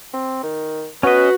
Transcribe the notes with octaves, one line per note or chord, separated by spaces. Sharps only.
C4
D#3
B3 C#4 F#4 B4 D#5